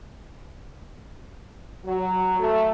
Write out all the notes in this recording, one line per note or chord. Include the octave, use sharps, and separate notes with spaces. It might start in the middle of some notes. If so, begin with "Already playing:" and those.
F#3
A3